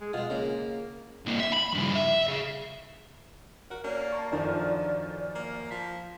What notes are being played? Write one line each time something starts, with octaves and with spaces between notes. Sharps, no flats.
G#3
B2 G#3 F4
C#3 A#3 C#4
C2 A#3
E5
B5
G2 C#3
E5
C#3
F#4 A#4
A#3 C#4 D5
A5 A#5 C#6
F#2 D3 D#3 F3
A#3
F3 B6